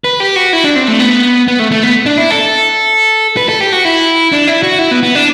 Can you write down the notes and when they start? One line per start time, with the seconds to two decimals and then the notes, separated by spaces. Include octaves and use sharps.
0.04 B4
0.20 G4
0.36 F#4
0.53 E4
0.64 D4
0.76 C4
0.88 A3
1.00 B3
1.48 B3
1.59 A3
1.71 A3
1.83 B3
2.06 D4
2.18 E4
2.30 A4
3.37 B4
3.49 A4
3.60 G4
3.72 F#4
3.85 E4
4.32 D4
4.47 E4
4.63 F#4
4.79 E4
4.91 B3
5.03 B3
5.15 D4